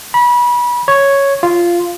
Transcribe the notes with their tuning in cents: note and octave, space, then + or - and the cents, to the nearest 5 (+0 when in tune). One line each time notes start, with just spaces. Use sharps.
B5 -30
C#5 +0
F4 -10